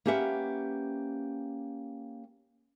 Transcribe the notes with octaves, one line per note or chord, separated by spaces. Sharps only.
A#3 C#4 G4 B4 E5 F#5